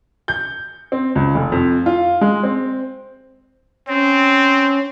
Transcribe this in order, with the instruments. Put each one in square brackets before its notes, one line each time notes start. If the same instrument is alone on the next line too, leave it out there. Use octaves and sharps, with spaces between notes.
[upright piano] G6
C4
C#2
F1
F2
F4
G#3
C4
[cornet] C4 [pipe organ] C#4